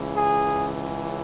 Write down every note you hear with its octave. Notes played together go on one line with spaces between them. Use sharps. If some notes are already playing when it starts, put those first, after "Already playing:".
Already playing: C#2 C#3 E3
G#4